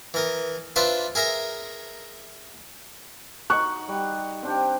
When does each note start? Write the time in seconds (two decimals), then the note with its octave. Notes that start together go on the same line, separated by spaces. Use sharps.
0.14 E3 A#4 D#6
0.76 D4 F4 B4 C5 D5 E5
1.15 G#4 A#4 E5 A#5
3.50 D#4 F#4 C#6 F#6
3.89 G3
4.43 C4 D4 G4